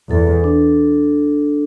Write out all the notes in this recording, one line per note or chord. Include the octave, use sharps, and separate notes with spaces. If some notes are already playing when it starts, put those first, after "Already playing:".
E2 A4
D4